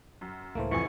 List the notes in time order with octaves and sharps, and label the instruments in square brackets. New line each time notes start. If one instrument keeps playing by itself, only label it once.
[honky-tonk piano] F#2
[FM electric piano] C#2 A2 C5 [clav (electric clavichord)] E3 A3 A#3
[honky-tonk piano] A1 C3 G#5 [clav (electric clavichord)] F2 E3 [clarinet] C#6